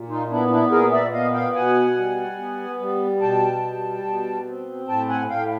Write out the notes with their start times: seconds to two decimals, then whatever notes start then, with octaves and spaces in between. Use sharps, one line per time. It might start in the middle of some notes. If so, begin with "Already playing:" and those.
Already playing: A#2
0.08 D#4 F4
0.29 B3 D4 E4
0.50 D4 E4
0.71 A#2 G#4 A#4
0.92 D5 E5
1.13 B3 D#5 F5
1.34 F5 G5
1.55 B2 F#5 G#5
1.96 G3
2.38 B3
2.79 G3
3.21 B2 G5 A5
3.63 G3
4.05 B2
4.46 C4
4.88 A2 G5 A5
5.09 F#5 G#5
5.30 A2 F5 G5